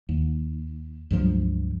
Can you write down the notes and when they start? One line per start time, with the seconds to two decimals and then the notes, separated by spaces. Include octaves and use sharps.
0.09 D#2
1.11 C#2 G2 F3 F#3